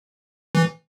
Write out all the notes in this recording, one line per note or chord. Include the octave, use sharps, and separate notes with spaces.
E3